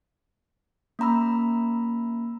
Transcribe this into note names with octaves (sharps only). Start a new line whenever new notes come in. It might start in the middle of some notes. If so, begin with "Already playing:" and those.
A#3 C#4 A#5 B5 E6